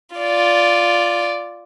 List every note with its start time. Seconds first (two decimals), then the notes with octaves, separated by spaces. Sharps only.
0.16 F4 D5